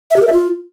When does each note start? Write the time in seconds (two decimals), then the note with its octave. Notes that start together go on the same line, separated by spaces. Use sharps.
0.11 E5
0.16 G4
0.22 A#4
0.27 E5
0.33 F4